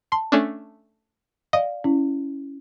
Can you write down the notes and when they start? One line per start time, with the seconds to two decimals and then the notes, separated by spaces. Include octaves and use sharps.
0.12 A5 C6
0.32 A3 C#4 D4
1.53 D5 D#5 F5
1.84 C#4 E4